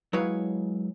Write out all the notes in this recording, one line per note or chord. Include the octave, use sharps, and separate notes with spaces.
F#3 G#3 E4 B4 C#5 F5